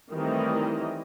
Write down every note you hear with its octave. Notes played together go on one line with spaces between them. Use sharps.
D#3 E3 G3 A3 C4 D#5